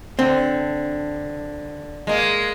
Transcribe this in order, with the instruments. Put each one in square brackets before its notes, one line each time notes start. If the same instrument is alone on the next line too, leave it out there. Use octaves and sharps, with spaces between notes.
[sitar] D3 [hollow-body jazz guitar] C4
[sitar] G#3 A#3